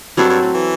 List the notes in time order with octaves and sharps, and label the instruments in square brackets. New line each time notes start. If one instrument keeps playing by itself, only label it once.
[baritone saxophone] G2 [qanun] F#3 C4 F#4 A4
[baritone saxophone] G2
A2
E3